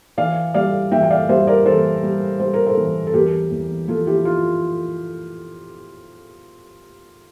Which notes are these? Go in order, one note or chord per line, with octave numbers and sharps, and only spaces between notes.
E3 D5 F5
G3 D5 F5
E3 E5 G5
G5
D5 F5
G3 C5 E5
A#4 D5
E3 A4 C5
G3
G3 C5
A#4
A4 C5
E3
A4
E2 G4 A#4
E2
F3 F4 A4
E4 G4
F4